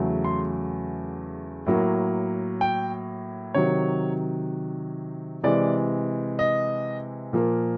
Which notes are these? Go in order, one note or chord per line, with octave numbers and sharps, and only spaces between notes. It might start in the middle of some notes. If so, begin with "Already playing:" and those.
Already playing: E2 C#3 F#3 A3
C6
A2 F#3 A#3
G5
C3 D#3 F#3 C#5
C3 E3 G#3 D5
D#5
A#2 F3 A#3